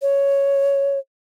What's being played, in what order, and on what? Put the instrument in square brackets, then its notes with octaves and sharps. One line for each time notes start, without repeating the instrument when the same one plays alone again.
[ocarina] C#5